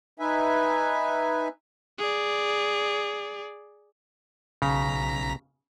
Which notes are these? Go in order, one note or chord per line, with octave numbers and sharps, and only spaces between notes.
D#4 B4 E5 G#5
G#4 D5
B1 C#3 A#5 B6